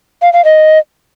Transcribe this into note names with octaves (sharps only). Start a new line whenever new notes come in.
F5
F5
D#5